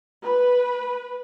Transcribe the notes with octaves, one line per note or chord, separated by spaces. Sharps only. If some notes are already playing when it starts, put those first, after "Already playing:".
B4